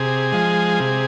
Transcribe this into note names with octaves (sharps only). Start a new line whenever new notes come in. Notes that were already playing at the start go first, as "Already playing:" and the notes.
Already playing: C3 G#4
F3 G#3
C3